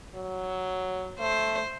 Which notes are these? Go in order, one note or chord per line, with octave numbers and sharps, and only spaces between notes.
F#3
A3 C5